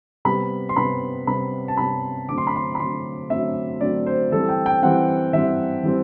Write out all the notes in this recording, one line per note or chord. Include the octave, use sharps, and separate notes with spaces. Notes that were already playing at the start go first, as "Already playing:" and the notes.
C3 G3 B3 B5
C6
C3 G3 B3 B5
C3 G3 B3 B5
A5
C3 G3 B3 B5
D3 F#3 A3 C4 D6
C6
B5
C6
B5
D3 F#3 A3 C4 C6
D3 F#3 A3 C4 E5
D3 F#3 A3 C4 D5
C5
E3 G3 C4 A4
G5
G5
E3 G3 C4 F#5
E3 G3 C4 E5
E3 G3 C4